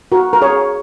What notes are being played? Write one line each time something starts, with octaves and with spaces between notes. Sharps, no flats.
F#4 A#4
A#4
G#4 C#5